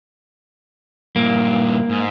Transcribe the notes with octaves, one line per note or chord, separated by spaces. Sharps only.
G2 A#2 A#3
G#2